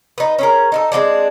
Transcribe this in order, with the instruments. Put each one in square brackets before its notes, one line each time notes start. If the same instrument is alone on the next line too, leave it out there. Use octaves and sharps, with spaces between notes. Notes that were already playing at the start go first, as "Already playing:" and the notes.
[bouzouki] D#4 B4
C#4 G#4 A#4
D#4 E4 A4
G#3 A3 C4 D4